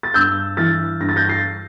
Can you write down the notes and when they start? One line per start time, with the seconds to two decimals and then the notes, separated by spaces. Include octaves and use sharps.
0.03 A6
0.14 G2 E6 G6
0.57 E3 F6 A6
1.00 G2 A#6
1.09 A6
1.16 G6 A#6
1.29 A6 C7